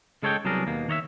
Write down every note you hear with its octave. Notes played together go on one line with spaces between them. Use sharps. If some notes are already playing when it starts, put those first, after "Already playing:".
C#3 G#3 A4 C#5 E5 G5
C2 F#3 B3 D4 G#4 A#4
D#2 B2 A#3
D#3 C#5 D#5 E5